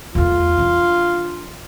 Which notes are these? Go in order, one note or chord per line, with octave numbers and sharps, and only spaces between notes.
E2 A3 F4
E3 D4